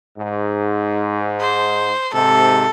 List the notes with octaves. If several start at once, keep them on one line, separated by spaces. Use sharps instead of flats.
G#2
C5
G#2 C3 A4